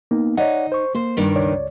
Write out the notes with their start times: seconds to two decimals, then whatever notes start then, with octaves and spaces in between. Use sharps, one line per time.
0.11 A#3 B3 D#4
0.37 D#4 C#5 D5 F#5
0.72 C5 C#6
0.95 A#3 C5
1.17 G2 D#3 D4
1.36 C#2 C#5 D5